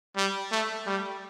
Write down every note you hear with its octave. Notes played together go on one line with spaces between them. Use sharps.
G3
A3
G3